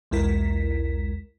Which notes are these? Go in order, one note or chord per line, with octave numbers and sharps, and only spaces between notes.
B1 E2 G#3 E4 A#4 B6